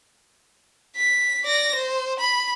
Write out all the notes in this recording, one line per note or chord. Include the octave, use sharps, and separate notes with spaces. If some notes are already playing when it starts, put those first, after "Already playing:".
B6
D5 A#6
C5
B5